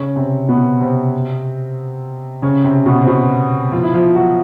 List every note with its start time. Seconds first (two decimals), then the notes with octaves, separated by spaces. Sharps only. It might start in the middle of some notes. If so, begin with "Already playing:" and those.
Already playing: C#3 C#4
0.16 C3 C4
0.48 B2 B3
0.81 C3 C4
2.42 C#3 C#4
2.64 C3 C4
2.86 B2 B3
3.02 C4
3.07 B2 B3
3.72 F3 F4
3.84 E4
3.94 F3 F4
4.15 F#3 F#4